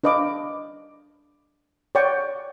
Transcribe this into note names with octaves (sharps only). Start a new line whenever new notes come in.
D4 B4 D#5 F5 D6
C#5 D5 F#5 G5 C#6